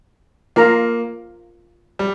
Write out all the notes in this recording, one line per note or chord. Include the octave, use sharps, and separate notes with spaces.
A#3 F4 A#4 F5 A#5
G3